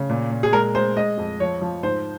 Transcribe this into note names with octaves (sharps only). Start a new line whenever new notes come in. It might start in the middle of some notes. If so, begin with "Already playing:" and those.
Already playing: C#3
A#2
A#2
G#4
G#3 A#4
G#3 C5
G#3 D#5
F2
F3 C#5
F3
G#2 C5